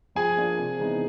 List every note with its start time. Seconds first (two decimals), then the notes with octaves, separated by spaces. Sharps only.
0.15 F3 G#4 G#5
0.37 A#3 D4 F4
0.58 C3
0.79 E3 G#3 B3 D#4